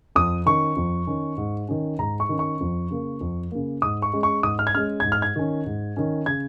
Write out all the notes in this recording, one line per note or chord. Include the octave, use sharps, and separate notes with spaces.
F2 D#6
D#3 C#4 C#6
F2
D#3 C#4
G#2
D#3 C#4
G#2 A#5
C#6
D#3 C#4
C#6
F2
C#3 A#3
F2
C#3 A#3
G#2 D#6
C#6
G#3 C#4
C#6
G#2 D#6
F6
G#6
G#3 C#4 F6
G#2 G#6
F6
G#6
D#3 C#4
G#2
D#3 C#4
C#3 G#6